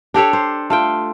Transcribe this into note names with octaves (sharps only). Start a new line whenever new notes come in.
D4 G4 A4 C#5
C5
A3 F4 G5